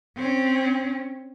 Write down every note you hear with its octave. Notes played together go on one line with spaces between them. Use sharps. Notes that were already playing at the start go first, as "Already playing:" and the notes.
C4 C#4